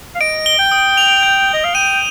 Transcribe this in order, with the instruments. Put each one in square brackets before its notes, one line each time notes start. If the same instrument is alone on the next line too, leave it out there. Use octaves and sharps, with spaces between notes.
[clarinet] F5
[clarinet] D#5 [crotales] D7
[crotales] G7
[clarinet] G5
[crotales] D#6
F7
G6
[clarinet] D#5 [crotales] G6
[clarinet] F5
[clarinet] G5 [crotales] D#7